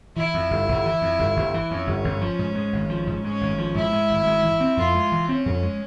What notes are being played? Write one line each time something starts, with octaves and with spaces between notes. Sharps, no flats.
E3 E4
F2
G1
G1
E3
F2
G1
G1
E3
F2 C#4
G1
G1
F3
G#2
G#3
G#1
F3
G#2
G#3 C#4
G#1
F3
G#2 E4
G#3
G#1
G#3
E3
C4
F2 F4
G#3
E3
C4 C#4
F2
G#3